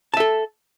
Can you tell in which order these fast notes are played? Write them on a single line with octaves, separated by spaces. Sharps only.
A5 E5 A4